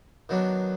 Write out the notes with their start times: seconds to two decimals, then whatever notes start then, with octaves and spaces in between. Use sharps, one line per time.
0.29 D#3 F#3 B3 D4